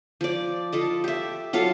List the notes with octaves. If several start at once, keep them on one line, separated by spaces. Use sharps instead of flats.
F3 D5
F4 A4 D#5
G4 E5
F#3 F4 A4 F5